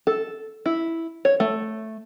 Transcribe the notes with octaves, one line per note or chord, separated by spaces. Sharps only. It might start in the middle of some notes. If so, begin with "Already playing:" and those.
A4
E4
C#5
A3